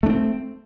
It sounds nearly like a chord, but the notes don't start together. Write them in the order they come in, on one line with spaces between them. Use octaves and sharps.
A3 D4 C4